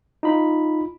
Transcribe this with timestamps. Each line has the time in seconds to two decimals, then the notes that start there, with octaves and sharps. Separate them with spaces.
0.23 D#4 F4 B5